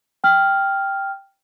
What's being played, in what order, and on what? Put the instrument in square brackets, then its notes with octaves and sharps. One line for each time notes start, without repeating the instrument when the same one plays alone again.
[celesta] G5 F6